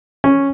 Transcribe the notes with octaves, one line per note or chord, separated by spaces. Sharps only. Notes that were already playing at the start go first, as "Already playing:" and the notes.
C#4